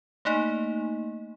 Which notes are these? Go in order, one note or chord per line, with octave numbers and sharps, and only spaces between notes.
A3 A#3 D#4